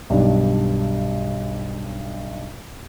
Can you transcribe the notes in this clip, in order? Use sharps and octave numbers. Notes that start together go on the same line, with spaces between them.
B1 G2 B2 D#3 G3 D4